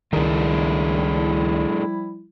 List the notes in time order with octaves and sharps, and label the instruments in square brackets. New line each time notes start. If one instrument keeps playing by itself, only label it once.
[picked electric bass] C#2 D#3 [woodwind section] F3 G3 E4 [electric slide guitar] A3 D4 G#4